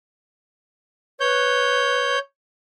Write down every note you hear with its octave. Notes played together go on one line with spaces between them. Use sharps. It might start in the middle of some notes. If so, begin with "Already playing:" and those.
B4 C#5 G6